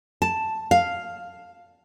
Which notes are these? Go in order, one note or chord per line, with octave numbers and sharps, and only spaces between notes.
A5
F5